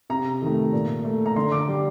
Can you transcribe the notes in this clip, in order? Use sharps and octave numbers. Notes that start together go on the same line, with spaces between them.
C3 A#5
D#3 A3
A#2
A3
A#5
D3 C6
D6
G3